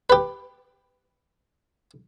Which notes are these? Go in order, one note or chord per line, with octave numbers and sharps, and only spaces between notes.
G4 B4